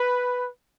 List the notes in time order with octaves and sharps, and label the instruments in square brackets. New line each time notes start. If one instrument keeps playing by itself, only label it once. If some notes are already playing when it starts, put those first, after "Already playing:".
Already playing: [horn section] B4